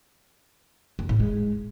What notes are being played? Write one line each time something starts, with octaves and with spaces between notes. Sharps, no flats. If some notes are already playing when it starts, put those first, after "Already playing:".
F#2
A2
G#3